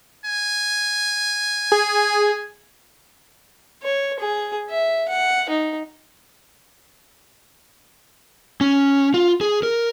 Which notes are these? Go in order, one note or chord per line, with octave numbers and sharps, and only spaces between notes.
G#5
G#4
C#5
G#4
E5
F#5
D#4
C#4
F4
G#4
A#4